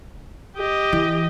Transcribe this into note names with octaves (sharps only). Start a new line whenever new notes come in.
G4 D#5
E3